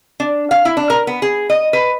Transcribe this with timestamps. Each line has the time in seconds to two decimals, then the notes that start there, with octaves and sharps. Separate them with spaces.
0.20 D4
0.51 F5
0.65 E4
0.77 D4
0.90 A#4
1.07 B3
1.22 G#4
1.50 D#5
1.73 B4